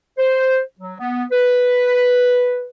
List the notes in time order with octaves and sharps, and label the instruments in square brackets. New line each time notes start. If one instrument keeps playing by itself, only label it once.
[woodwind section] C5
F#3
B3
B4